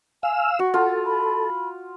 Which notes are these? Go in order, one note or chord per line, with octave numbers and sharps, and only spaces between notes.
F5 G#5 E6
F#4 C#6
F4 A4 F#5
B5